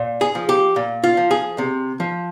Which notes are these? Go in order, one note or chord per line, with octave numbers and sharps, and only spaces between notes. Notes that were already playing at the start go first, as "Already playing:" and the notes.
Already playing: A#2
G#4
F3
G4
A#2
F4
F3
G#4
C3
F3